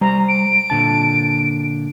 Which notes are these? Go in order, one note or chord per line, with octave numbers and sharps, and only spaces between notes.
G3 C5 A#5
D7
A#2 D3 A5